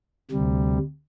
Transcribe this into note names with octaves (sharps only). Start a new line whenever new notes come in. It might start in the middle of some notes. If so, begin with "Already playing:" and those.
D2 C3 G3